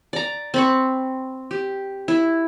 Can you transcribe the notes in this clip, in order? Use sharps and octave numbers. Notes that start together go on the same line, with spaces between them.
D5 A#5
C4 B5 C#6
G4
E4